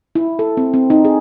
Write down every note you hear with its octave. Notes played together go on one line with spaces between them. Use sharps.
E4
A4
C4
C4
D#4
G#4